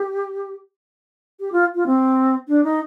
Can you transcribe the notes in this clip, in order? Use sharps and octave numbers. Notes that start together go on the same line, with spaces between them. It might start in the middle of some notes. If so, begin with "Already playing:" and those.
Already playing: G4
G4
F4
F4
C4
D4
D#4